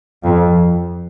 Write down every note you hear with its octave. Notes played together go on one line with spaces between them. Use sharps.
F2